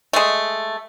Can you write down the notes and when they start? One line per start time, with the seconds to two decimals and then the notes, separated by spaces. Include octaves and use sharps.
0.13 G#3 A3